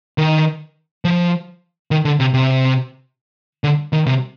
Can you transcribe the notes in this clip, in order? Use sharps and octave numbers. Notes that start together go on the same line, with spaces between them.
D#3
F3
D#3
D3
C3
C3
D3
D#3
C3